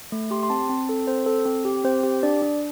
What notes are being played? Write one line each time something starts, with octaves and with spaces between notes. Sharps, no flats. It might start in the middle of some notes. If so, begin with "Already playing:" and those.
A3
G4 C6
C6
C4 A5
C4
A4
A4
C4 C5
A4
C4
G4
C4 C5
G4
D4 D5
D4